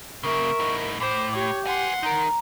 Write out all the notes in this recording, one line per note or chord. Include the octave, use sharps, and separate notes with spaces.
C#3 A#3 A#4 E5 C#6
A2 D#4
A2 C5 D6
G4 C#5
B4 F#5 G#5 C6
D#4 A#4 A#5